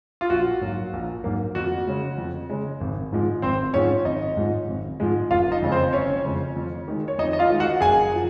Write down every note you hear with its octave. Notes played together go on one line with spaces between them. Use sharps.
F4
A#1 F#4
G#2 F#3 A#3
A#1
G#2 F#3 A#3
F2 F#4
C#3 G#3
F2
C#3 G#3
G#1
G#2 F3 G#3
G#1 C4 C5
G#2 F3 G#3 C#4 C#5
G#1 D#4 D#5
G#2 F3 G#3
G#1
G#2 F3 G#3
F#1 F4 F5
D#4 D#5
F2 C#3 G#3
C4 C5
F#1 C#4 C#5
F2 C#3 G#3
F2
D#3 G#3
C#5
F2 D#4 D#5
D#5
F4 F5
D#3 G#3
F#4 F#5
F#1 G#4 G#5
F3